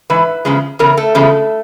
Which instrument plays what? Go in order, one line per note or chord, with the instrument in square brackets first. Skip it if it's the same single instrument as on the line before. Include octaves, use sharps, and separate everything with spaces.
[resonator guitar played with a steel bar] G#2 E3 B4
E2 C#3 F3 G#3
E2 C#3 A#4
A3 A4
E2 C#3 F3 G#3